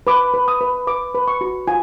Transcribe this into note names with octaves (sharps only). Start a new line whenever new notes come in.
B4 D6
B4
D#6
B4
B4 D6
B4
C#6
F#4
F4 G#5